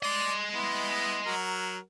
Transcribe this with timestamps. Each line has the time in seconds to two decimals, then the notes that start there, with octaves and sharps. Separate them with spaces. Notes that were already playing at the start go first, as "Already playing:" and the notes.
0.03 D5 D#5 C6
0.53 B3 E4
1.26 F#3 F#4 A#4